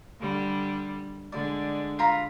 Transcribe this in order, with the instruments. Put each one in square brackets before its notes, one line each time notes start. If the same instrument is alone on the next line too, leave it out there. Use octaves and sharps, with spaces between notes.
[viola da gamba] D3 G3
[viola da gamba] D3 G#3 [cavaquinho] D5
[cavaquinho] F4 A#5 B5